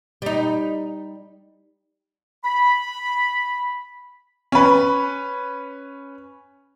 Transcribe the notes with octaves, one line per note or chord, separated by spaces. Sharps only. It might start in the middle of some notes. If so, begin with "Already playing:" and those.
G3 D#4
B5
C#4 B4